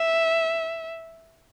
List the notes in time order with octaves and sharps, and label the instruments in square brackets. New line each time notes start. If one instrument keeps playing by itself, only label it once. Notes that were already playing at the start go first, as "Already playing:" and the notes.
Already playing: [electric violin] E5